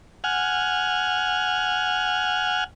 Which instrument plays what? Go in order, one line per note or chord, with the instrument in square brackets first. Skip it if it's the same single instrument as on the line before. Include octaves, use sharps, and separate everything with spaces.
[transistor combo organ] F#5 G#5 F6